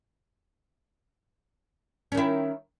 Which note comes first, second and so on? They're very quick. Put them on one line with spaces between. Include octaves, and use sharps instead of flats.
C#4 D#3 E4